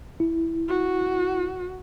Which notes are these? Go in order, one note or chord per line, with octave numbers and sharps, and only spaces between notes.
E4
F#4